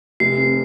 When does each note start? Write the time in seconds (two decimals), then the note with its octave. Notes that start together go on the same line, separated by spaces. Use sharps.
0.20 F1 C7
0.38 C3